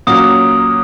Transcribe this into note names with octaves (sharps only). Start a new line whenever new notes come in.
A#2 F#3 A#3 C#4 F#4 D#6